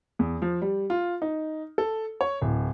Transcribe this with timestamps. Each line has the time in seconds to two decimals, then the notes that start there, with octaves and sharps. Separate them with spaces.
0.19 E2
0.42 F3
0.62 G3
0.90 F4
1.22 D#4
1.78 A4
2.21 C#5
2.41 D1